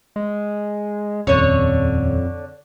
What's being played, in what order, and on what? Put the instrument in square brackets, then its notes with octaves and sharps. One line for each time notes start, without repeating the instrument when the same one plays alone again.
[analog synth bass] G#3
[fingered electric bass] D#1 C#4 [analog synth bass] F2 [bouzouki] D3 C#5